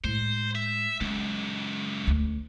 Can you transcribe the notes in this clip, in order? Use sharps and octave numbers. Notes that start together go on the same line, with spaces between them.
A2 G#3 C5
E5
C#2 F#2 G#3
D2